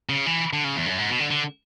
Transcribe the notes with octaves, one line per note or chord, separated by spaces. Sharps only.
C#3
E3
D3
C#3
E2
F#2
G#2
B2
D3
D3